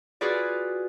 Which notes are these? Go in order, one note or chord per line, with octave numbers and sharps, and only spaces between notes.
F4 F#4 G#4 B4 D5